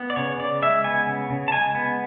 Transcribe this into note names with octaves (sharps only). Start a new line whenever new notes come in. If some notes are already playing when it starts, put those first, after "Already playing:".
Already playing: B3
D5
C#3 C#5
C#3 D5
G#3 E5
B3 G#5
C#3
C#3
A5
G#3 G#5
B3